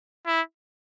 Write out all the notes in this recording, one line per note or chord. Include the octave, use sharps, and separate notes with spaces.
E4